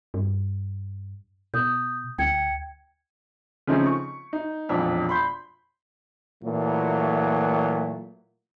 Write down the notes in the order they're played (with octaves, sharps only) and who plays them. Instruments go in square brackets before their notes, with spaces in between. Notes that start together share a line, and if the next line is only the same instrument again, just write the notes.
[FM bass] G2
[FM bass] B2 [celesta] D#6 G6
[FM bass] D2 [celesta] G5 G#6 C#7
[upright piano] C#3 F3 A3 C4 C#4 D#4
C#6
D#4
E1 A#1 F2 D4
B5 C6 G6
[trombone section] A#2 E3 F#3 A3